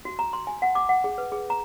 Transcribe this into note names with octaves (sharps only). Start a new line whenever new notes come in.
F#4
A#5
C6
G#5
F#5
D6
F#5
G#4
B4
G#4
A#5